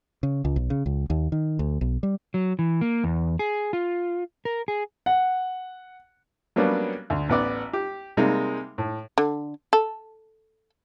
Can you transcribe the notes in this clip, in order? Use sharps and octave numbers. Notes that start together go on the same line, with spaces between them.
C#3
C#2
B1
C#3
C#2
D#2
D#3
D2
B1
G3
F#3
E3
A#3
E2
G#4
F4
A#4
G#4
F#5
F#3 G3 A#3 B3 C#4 D4
D2
A1 B3 D5
G4
C3 G3 G#3 A#3 D#4
A2
D3
A4